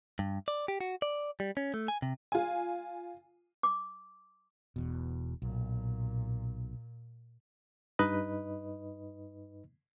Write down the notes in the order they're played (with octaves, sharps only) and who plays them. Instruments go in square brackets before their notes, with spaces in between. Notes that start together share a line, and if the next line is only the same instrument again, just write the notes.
[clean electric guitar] G2
D5
G4
F#4
D5
G3
C#4
A3
G#5
C3
[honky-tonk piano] F4 G#5
[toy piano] D6
[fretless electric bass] E1 E2 B2
[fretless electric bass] B1 [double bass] A#2
[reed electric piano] G2 D#4 B4 D#5